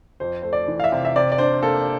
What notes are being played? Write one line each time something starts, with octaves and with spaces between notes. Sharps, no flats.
F2 C5
A3 C5
D5
E3
F5
E5
C3
E5
C3 D5
D5
D4 C5
A#3 A4